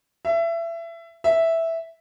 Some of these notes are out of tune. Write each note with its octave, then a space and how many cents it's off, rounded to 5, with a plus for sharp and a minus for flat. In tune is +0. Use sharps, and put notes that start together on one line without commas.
E5 +25
E5 -5